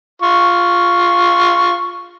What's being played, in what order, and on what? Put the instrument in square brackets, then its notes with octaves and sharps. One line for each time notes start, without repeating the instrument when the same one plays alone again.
[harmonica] F4 C#6